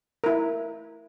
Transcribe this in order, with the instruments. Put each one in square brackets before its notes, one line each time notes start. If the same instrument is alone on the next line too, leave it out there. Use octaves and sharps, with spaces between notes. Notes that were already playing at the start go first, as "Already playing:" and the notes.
[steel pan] E4 A#4